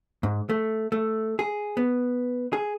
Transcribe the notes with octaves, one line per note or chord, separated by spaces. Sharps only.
G#2
A3
A3
G#4
B3
G#4